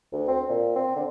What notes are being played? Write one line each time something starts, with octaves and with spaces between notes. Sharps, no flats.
D2
C4
A#2
C4
D3